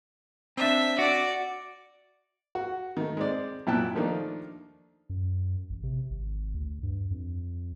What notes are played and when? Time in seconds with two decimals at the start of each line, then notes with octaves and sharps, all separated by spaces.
0.57 C4 D4 E5
0.99 F#4 D5
2.55 F#4
2.97 D#3 A3
3.17 G#3 C4 D5
3.67 F#2 A#2 E4 G5 A5 F#6
3.95 D#3 F3 A3 A#3 D4 D#4
5.10 F#2
5.70 A1
5.84 C3
6.11 G#1
6.54 D2
6.83 G2
7.11 F2